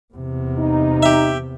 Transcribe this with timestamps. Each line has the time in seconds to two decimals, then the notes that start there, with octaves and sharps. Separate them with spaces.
0.14 E2 C3
0.58 D#4
1.03 G4 E5